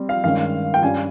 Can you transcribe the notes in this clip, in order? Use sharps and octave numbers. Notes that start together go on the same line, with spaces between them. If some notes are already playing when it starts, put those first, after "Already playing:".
Already playing: G3 C4
F5
G2 D#3 G#3 C#4 F5
G5
G2 G3 C#4 G#5